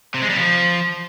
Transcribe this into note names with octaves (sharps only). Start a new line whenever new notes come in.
C3
G#3
G3
F3